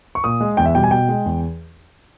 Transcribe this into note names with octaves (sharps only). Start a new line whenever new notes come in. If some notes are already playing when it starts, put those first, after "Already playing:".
C#6
A#2 D#6
G#3
E2 G5
E5
B2 G3 G5
G#5
B2 G5
G#3
E2